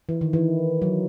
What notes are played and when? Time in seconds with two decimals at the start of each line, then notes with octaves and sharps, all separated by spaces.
0.09 E3
0.21 D#3
0.33 E3
0.82 F#3